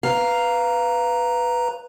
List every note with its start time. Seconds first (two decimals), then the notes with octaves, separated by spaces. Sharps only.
0.03 B4 F5 A#5